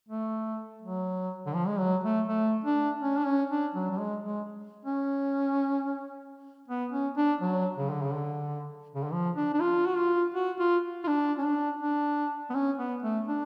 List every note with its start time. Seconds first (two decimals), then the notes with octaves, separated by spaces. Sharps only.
0.09 A3
0.82 F#3
1.47 D3
1.55 F3
1.67 G#3
1.79 F#3
2.04 A3
2.28 A3
2.65 D4
3.02 C#4
3.18 D4
3.26 C#4
3.50 D4
3.75 F#3
3.91 F#3
3.99 G#3
4.24 G#3
4.85 C#4
6.68 B3
6.92 C#4
7.17 D4
7.41 F#3
7.77 C#3
7.90 D3
8.02 C#3
8.14 D3
8.95 C#3
9.04 D3
9.13 F3
9.36 D4
9.53 D4
9.60 F4
9.86 F#4
9.97 F4
10.35 F#4
10.59 F4
11.04 F4
11.07 D4
11.38 C#4
11.44 D4
11.80 D4
12.50 B3
12.55 C#4
12.78 B3
13.02 A3
13.28 D4